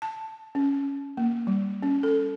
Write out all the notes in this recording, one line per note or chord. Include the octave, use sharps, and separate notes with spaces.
A5
C#4
A#3
G3
C#4
A4